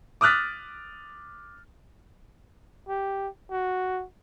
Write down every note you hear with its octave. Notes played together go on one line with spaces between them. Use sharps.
D6 D#6 F6 F#6 A6 B6
G4
F#4